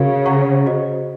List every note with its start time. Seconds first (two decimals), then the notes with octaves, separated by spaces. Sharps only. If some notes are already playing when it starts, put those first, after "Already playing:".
Already playing: C#3 F#4 A#4 F5
0.25 C#5 F#5 A#5 C#6
0.66 F#4 C5 D#5